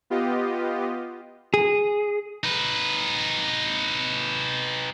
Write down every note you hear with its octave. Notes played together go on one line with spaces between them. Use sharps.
B3 F4 G4 D#5
G#4
D#4 B4